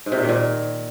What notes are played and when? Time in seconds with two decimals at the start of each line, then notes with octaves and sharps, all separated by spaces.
0.06 G#2
0.12 C3
0.17 A#2
0.23 D#3
0.29 A#2